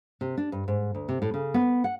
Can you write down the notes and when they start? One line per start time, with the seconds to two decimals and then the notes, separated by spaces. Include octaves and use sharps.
0.21 C3
0.37 D4
0.52 G2
0.68 G#2
0.95 D2
1.09 C3
1.22 A2
1.34 C#3
1.54 B3
1.84 F#5